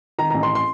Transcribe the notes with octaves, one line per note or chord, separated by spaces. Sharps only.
D#3 A#5
A1 A#5
C6
C6